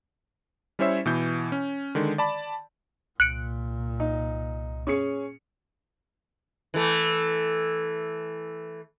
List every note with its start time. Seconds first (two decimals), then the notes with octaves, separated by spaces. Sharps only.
0.79 G3 C#4 E4 C5 C#5 E5
1.06 B2 E3 G6
1.52 C#4
1.95 D3 D#3 G#3
2.18 D5 A5 B5
3.20 C2 A#2 F#6 C#7 D7
4.00 D#4
4.87 C#4 G#4 C#7
6.74 E3 A3